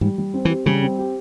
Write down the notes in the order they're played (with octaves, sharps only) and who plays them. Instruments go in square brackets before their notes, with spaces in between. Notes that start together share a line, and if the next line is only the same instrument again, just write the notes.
[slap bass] G#2 [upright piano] G3
[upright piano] G3
C4
[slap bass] E3
[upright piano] G4
[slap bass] C#3 [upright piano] G3
[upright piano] C4
G4